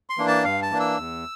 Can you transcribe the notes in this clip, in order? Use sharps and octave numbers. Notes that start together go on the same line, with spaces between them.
C6
E3 A#3 D4
A5
G2 F5
A5
E3 A#3 D4
E6
E2